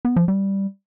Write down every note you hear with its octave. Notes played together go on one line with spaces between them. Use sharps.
B3
F3
G3